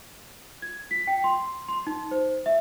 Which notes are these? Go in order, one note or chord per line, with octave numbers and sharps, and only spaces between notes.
G#6
B6
G5
C6
C6
D#4
C5
E5